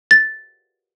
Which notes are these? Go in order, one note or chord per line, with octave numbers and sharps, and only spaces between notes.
A6